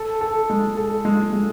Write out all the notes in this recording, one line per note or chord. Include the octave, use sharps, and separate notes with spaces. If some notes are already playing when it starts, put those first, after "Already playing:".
Already playing: A4
A4
G#3
A4
G#3
G#3